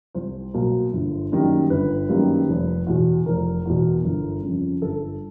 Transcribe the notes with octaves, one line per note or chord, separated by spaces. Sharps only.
C2 C5
B2 F#3 A#3
G1
F#2 D#3 G3 A#3
G1 B4
F#2 D#3 G3 A#3
F1
E2 B2
F1 A#4
E2 B2
G1
F2 C#3
G1 A4